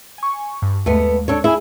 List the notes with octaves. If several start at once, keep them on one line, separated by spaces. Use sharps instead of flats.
G#5 C#6
G2
D#2 G#3 A3 B3
D4 A4 C#5
E4 G#4 G#5